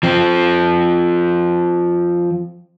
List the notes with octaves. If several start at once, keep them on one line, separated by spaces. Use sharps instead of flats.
F3 C4